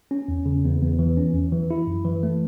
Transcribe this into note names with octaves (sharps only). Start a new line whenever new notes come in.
C#4
E2
C#3
E2
E2
E3
C#4
E2
E3
E4
F#2
E3
A3